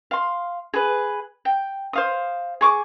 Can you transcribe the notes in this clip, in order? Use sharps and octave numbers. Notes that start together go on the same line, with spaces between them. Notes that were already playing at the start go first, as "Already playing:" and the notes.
F5 C6
G#4 B4
G5
C5 F5 D#6
G#4 C#6 D6